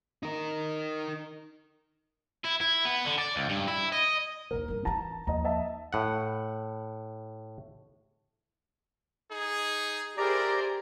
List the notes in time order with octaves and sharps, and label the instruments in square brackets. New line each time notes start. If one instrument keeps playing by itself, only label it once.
[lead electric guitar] D#4 A#4
[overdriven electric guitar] E4
E4
B3
D3
D5
C#2
G2
E4
D#5
[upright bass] A#1 D#2 [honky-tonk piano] A#4
[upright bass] G2 D#3
[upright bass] E3 D#4 [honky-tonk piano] A5 A#5
[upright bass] D#2 F3 [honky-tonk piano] D#5 A#5
[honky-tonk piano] D#5 E5 A5
[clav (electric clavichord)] A2 F#5
[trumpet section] D#4 G#4
[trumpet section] E4 A#4 [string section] G4 G#4 C5 [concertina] D5 A#5